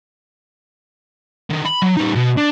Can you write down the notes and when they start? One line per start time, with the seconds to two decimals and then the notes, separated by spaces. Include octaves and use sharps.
1.50 D3 D#3
1.65 B5
1.82 F#3
1.97 G3 D#4
2.15 B2
2.37 D4